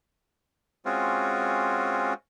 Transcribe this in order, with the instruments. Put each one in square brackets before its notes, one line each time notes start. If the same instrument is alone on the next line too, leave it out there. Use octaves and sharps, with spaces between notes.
[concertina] G#3 C4 C#4 F4 F#4